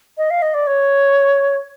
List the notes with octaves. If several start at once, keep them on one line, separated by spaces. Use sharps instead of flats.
D#5
F5
D#5
D5
C#5